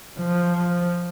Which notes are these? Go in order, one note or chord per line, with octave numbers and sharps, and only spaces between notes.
F3